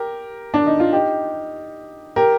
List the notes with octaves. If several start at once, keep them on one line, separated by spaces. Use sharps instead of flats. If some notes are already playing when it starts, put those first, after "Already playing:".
Already playing: G4 A#4
D4
D#4
F4
D#4 G4
G4 A#4